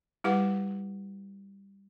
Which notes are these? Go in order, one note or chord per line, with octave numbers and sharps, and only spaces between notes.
G3 E4 G4 B4 F#5 D6